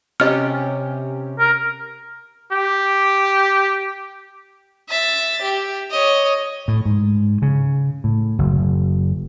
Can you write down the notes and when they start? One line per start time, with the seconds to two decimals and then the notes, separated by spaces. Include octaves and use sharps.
0.20 C3 C#4 G4 D#5 F6
1.39 A#4
2.52 G4
4.89 E5 A6
5.42 G4
5.90 C#5 D#5
6.68 A2
6.85 G#2
7.42 C#3
8.04 A2
8.39 F#1